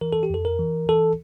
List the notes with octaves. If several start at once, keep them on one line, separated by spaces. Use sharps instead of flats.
E3 A#4
A4
G4
F2 A4
A#4
E3
E3 A4